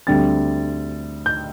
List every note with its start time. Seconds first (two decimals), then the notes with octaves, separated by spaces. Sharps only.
0.07 D2 D3 G3 C4 A6
1.26 G6